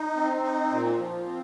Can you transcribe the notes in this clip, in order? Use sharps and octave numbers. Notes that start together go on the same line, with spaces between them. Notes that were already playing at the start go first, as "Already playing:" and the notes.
Already playing: D#4
C4
D#4
A#2
F3
C4